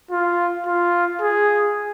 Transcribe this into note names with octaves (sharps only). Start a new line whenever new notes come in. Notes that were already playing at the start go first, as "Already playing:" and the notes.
F4
F4
G#4